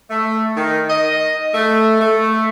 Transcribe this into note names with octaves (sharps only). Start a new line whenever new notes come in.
A3
D#3
D#5
A3
A3